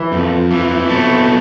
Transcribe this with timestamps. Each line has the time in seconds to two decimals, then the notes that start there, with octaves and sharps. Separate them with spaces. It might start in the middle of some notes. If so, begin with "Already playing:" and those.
Already playing: E3
0.12 F2
0.51 E3
0.89 B2 A3